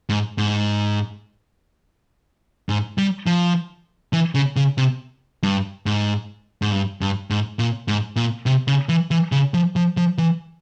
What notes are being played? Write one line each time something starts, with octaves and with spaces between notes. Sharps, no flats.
G#2
G#2
G#2
G3
F3
E3
C#3
C#3
C3
G2
G#2
G#2
G2
G2
G#2
A#2
G#2
A#2
C3
C#3
E3
E3
C#3
F3
F3
F3
E3